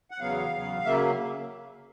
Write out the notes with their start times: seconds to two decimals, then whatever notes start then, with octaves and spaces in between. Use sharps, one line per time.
0.11 F#5
0.20 E2 C#3 F#3 B3 F5
0.52 E2 C#3 F#3 B3
0.85 C#3 F#3 A#3 E5